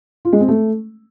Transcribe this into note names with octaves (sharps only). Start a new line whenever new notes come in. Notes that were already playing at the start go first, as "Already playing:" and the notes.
F4
G#3
C4
A3